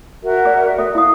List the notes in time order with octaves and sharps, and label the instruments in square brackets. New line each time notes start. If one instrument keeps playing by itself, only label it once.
[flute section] F#4 A#4 E5
[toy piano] G#4 D5
A4 E5
[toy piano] E4 D#6 [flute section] F5